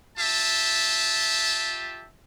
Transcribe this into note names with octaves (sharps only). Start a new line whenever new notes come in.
F4 G4 E5 A5